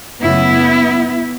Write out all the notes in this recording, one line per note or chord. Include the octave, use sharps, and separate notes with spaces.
F#2 C#3 A3 B3 E4